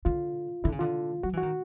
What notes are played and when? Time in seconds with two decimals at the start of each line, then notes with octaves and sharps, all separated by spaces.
0.05 D3 F4
0.64 D3 E4
0.72 C#3
0.79 D3 F4
1.23 F#3 F#4
1.33 E3
1.38 F#4
1.43 D#3